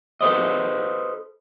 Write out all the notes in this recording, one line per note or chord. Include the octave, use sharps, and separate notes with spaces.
A4 B4 C5 D#5